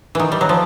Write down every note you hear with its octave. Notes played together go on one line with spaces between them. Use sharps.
D#3 E3
G3
F#3
F3